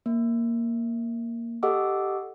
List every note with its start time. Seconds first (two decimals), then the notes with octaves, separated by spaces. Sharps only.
0.06 A#3
1.63 G4 A4 D#5 F#5 D6 E6